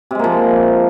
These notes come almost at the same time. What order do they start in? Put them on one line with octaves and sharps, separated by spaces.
C3 G#3 A#3 F3